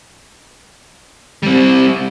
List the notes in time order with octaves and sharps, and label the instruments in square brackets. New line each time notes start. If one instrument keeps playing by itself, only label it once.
[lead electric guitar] G3 C4